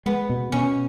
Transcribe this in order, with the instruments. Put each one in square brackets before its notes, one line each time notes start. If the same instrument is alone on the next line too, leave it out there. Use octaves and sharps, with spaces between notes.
[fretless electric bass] G#3 [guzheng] B3
[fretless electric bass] B2
[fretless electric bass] B2 [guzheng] C#4